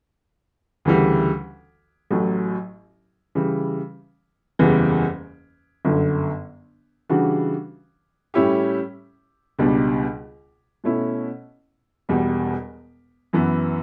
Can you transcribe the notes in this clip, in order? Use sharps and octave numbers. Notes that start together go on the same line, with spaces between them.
D2 C#3 E3 G3
A1 A2 F#3 A3
C#3 E3 G3
F#1 E2 C#3 E3 G3
G1 F#2 D3
C#3 E3 G3 D4 F#4
A2 G3 C#4 E4 G4
C#2 B2 G3 D4
B2 A3 C#4 E4
E1 E2 B2 G3
F#2 E3 B3